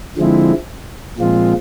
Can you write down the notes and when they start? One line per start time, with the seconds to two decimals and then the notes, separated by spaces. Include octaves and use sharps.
0.17 D3 F3 G#3 C4 E4
1.18 A#2 F3 G#3 C4 F4